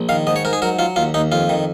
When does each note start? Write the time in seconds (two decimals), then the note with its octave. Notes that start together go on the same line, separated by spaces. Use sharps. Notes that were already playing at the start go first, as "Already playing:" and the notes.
Already playing: A#1
0.09 D#3 F5
0.27 G#2 D#5
0.36 C#5
0.45 G#2 A#4
0.53 G#4
0.62 F#3 A#4
0.79 F#3 F4
0.96 D#2 F4
1.14 D#2 D#4
1.32 F2 F4
1.49 D#3